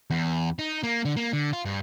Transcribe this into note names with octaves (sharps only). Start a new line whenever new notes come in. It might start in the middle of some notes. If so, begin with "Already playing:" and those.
E2
D#4
A#3
D3
A#3
D3
F4
G2